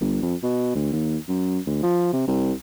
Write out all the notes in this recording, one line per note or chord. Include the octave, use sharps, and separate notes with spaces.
G1
F2
B2
D2
D#2
F#2
D2
F3
C3
C2